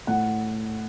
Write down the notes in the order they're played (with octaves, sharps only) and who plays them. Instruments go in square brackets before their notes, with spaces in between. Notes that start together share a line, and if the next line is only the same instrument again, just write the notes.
[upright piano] A2 F#5